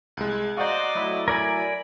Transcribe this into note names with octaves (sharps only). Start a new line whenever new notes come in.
C2 G#3 F#6 G#6 A6
F#4 C5 D5 D#5 F5 F#5 A#5
F#3 A3 E4
A#4 D5 G#5 B5 G#6